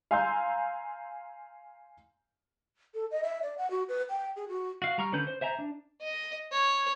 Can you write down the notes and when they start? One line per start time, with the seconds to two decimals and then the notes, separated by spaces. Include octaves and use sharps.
0.11 F5 G#5 A#5 C6 E6 G6
2.94 A4
3.11 D#5
3.23 E5
3.42 D5
3.58 F#5
3.71 F#4
3.89 B4
4.10 G5
4.36 G#4
4.49 F#4
4.82 F#4 F5
4.98 G3 A#5 C#6 F6
5.12 D3 C#4 B4 G6
5.27 C5
5.41 C5 E5 G#5 A#5
5.59 D4
6.02 D#5
6.52 C#5